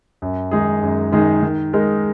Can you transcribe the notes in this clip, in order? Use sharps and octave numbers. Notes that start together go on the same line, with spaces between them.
F#2
D#3 G#3 D#4 G#4
F#2
D#3 G#3 D#4 G#4
D#3
G#3 D#4 A#4